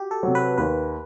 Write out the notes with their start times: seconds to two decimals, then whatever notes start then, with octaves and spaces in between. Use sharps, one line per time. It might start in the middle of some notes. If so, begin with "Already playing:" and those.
Already playing: F#4 G4
0.11 A4
0.23 C3 F#3
0.35 B4
0.58 D#2 B4